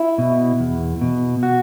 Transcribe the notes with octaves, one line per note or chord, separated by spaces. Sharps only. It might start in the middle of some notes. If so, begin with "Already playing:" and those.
Already playing: E4
B2
E2
B2
F#4